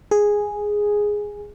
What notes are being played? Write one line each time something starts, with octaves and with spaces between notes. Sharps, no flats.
G#4